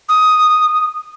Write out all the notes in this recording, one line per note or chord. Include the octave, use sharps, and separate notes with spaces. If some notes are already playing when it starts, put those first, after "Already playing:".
D#6